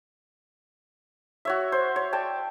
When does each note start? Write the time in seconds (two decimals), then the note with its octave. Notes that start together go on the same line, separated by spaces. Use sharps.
1.45 F#4 C#5 E5
1.72 C5
1.96 C#5
2.13 D5 G5 A5